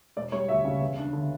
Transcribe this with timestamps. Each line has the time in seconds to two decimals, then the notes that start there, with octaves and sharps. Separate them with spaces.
0.16 E1 D5
0.32 G3 C#5
0.49 D2 E5
0.65 C#3
0.81 E2
0.98 D4
1.13 D3